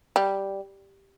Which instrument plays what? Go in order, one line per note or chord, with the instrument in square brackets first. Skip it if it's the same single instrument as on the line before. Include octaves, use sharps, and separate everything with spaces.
[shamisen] G3